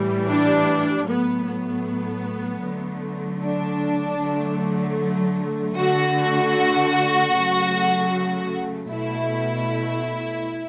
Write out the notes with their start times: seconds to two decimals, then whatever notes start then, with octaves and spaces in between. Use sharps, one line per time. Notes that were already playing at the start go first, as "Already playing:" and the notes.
Already playing: A2 E3 G3
0.29 D4
1.07 A2 F#3 A3 B3
1.46 B3
2.63 D3 F#3 A3
3.42 D4
4.20 D3 F#3 A3
5.77 D3 A3 F#4
7.33 C#3 F#3 A3
8.90 B2 A3 E4